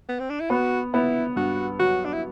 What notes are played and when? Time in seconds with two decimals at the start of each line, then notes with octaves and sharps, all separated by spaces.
0.09 B3
0.20 C4
0.30 D4
0.40 E4
0.50 B3 F#4
0.94 B3 E4
1.36 G2 F#4
1.80 F#3 F#4
2.05 D4
2.13 E4